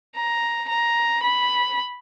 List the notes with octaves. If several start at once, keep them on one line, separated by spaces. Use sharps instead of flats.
A#5
A#5
B5